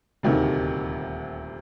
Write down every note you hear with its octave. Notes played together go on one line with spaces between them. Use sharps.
D#1 D2 C3 D#3